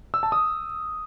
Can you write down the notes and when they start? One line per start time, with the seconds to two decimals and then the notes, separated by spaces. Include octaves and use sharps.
0.14 E6
0.23 A5
0.32 D#6